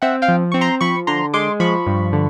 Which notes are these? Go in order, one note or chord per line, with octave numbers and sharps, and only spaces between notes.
C4 E5 F#5
F5 G5
F3
C4 C#6
A#5 C6
F3 B5 C#6
D3 A#5 C6
G#3 C6 D6
F3 B5 C#6
G2
D3